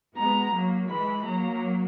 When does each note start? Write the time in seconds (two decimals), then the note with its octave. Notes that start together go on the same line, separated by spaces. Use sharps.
0.17 G#3 B3 A#5
0.54 F#3 A#3
0.89 E3 G#3 B5
1.25 F#3 A#3 A#5